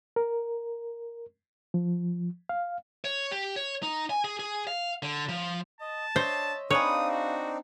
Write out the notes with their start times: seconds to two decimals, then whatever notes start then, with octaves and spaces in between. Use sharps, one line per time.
0.16 A#4
1.74 F3
2.49 F5
3.05 C#5
3.31 G4
3.56 C#5
3.83 D#4
4.10 G#5
4.25 G#4
4.39 G#4
4.67 F5
5.03 D3
5.29 F3
5.81 D#5 A5
6.16 D4 C5 C#5 D#5 E5
6.71 C4 D4 D#4 G#4 B4 C#5 F5 D#6
7.10 F#4